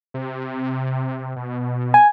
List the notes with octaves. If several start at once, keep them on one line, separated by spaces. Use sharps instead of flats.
C3
B2
G#5